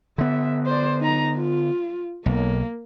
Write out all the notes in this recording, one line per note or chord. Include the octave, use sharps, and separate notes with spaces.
D3 B3 E5
C5 D5
D#4 A#5
F4
B1 A#3